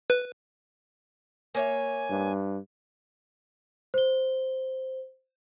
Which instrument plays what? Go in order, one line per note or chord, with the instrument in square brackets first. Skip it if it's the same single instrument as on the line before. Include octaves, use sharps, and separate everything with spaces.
[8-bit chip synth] B4
[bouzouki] A#3 C#5 E5 [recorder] G#5
[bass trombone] G2
[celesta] C5 G7